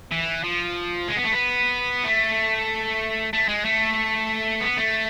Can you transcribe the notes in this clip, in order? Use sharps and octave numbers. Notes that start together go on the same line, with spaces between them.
E3
F3
G#3
B3
A3
B3
A3
A3
G#3
A3
B3
A3